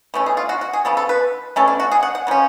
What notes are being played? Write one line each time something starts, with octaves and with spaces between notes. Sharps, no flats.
B2 A3 C#4
G#4
F4
F#4
F#4
G#4
C#3 F3 B3 A4
A4
B4
B2 A3 C#4 A4
D4
F#4
G#4
F#5
F#5
C#3 F3 C#4